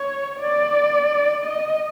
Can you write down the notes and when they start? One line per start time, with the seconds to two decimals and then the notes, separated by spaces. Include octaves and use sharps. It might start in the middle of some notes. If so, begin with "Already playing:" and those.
Already playing: C#5
0.40 D5
1.44 D#5